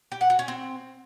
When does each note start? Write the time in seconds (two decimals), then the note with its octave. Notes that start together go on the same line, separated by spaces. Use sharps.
0.12 G4
0.21 F#5
0.30 F#4
0.39 C#4
0.48 C4